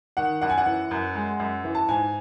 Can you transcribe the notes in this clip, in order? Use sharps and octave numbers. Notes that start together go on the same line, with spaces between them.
D#3 F#5
F#2 F#5
G#5
F#5
E3
F#2
G#3
F#2
E3
A5
G#2 G#5